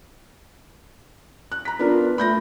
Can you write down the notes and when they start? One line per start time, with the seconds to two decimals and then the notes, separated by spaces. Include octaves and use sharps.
1.52 F#6
1.65 A#5 B6
1.79 B3 D4 F4 A#4
2.18 A3 B5 G6 A#6